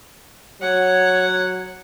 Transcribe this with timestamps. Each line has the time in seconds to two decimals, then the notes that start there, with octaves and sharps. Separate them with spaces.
0.61 F#3 C#5 F#5